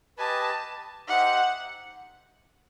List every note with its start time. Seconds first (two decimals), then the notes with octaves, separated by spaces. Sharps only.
0.18 G4 B4 D#5 G#5 A5
1.08 D#4 G4 C5 E5 F#5